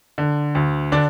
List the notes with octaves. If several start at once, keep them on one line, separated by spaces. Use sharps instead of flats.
D3
D2
D3 D4 D5